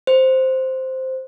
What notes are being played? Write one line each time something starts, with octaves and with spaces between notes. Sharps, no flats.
C5